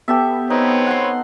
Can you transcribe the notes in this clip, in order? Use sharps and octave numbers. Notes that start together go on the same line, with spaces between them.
B3 G4 A4 E5
C4 D#4 B4 C#5
F#5 C6